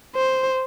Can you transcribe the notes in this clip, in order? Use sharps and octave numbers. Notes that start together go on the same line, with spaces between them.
C5